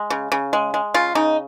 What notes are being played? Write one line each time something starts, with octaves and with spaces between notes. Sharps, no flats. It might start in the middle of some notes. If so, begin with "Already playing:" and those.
Already playing: G#3
C#3
C#3
G#3
G#3
C#3 F4
C#3 D#4